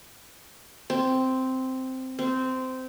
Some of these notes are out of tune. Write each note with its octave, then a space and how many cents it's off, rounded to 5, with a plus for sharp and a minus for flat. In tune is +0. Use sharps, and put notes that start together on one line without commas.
C4 -5
C4 -15